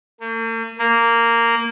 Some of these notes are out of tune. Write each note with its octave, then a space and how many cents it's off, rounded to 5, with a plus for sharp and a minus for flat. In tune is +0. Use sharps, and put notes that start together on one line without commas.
A#3 -45
A#3 -10